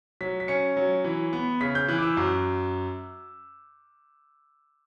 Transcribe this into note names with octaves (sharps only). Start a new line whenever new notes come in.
F#3 B6
B6
C#4 C#7
F#3
E3
B3
C#3 B6
G6
E3 F#6
D6
E6
F#2